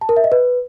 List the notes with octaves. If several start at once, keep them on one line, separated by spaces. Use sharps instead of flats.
A5
A#4
E5
D#5
B4